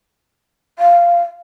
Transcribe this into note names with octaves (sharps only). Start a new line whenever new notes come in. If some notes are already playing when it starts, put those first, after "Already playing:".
F5